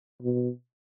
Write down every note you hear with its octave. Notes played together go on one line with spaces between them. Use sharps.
B2